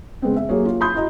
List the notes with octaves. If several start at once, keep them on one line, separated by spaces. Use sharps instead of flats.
C#3 G#3 B3 C4
E5
F#3 A#3 G4 G#4 C#5
F4
B5 C6 D#6 G6
E4 F#4 D#5 A#5